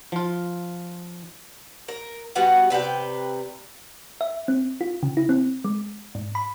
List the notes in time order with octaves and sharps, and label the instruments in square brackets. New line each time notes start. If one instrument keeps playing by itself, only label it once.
[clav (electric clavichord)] F3 F4
[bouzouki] A#4
G3 B3 F#4 F#5
C3 B4 D5 G5
[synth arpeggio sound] E5
C4
F4
C#3
E4
C4
G#3
G#2
B5